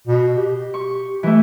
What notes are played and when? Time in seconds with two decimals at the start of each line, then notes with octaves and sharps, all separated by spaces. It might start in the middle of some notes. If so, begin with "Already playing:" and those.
0.08 B2
0.37 G4
0.74 C#6
1.23 E3 A3